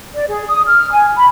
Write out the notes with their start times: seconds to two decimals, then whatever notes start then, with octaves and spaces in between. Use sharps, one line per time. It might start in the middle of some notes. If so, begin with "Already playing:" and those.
0.14 D5
0.28 G#4
0.48 D#6
0.66 F6
0.92 G#5
1.16 B5